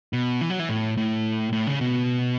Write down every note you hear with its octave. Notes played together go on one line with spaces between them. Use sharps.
B2
E3
F#3
E3
A2
A2
A2
C#3
B2